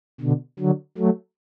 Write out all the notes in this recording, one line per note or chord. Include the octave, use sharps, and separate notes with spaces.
B2 D3
D3 F#3
F#3 A3